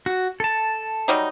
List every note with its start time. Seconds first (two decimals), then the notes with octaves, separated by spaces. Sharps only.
0.06 F#4
0.40 A4 A5
1.08 F#3 G3 D#4